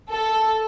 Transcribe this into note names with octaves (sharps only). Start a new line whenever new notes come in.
A4